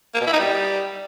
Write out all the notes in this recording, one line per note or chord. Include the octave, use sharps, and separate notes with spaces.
A#3
B2
E4
D#4
G3